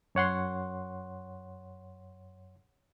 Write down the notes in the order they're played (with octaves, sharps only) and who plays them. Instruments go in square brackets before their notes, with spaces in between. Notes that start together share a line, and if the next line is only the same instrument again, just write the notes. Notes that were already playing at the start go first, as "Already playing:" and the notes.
[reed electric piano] F#2 C#5 F#5 C6